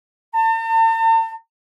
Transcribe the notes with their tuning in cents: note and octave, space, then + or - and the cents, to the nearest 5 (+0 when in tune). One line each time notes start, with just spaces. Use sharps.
A5 +45